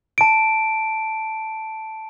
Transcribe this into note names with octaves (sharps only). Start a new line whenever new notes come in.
A5 D7